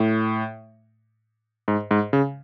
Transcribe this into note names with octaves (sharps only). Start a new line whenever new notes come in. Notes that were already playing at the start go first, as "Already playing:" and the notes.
Already playing: A2
G#2
G#2
C#3